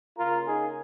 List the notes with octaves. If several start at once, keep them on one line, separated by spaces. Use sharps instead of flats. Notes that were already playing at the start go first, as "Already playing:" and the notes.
C#3 A#3 F4 A#4
D#4 G#4